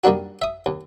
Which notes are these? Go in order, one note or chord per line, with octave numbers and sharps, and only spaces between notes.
D#3 G3 A#3 D4 F#4
E5 D#6
D#2